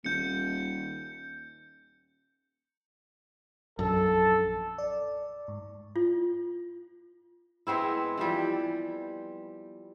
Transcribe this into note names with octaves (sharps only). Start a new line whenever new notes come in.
D#1 G6 C#7
A#1 F#2 A4
D5
G#2
F4
G#3 B3 C4 E4
E3 F3 G3